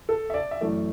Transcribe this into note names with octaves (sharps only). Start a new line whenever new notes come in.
A4
E5
D5
E5
F#2 E3 A3 D5